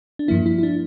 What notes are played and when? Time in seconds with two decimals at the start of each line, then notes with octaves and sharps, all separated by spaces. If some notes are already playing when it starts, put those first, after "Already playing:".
0.19 D4
0.28 G2 F3 A#3 E4
0.46 E4
0.58 E4
0.63 D4